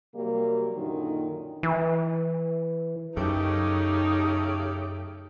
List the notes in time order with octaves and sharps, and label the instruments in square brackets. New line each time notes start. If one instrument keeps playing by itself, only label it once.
[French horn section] C3 F#3 G3 A#3
F#2 A#2 D3 D#3
[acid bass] E3
[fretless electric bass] F#2 [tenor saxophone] C#3 [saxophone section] A3 G4 [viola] D#4